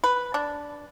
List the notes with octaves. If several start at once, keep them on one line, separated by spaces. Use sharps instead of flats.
B4
D4